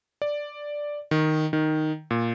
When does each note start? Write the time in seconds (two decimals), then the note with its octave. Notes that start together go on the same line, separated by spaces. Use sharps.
0.22 D5
1.11 D#3
1.53 D#3
2.11 A#2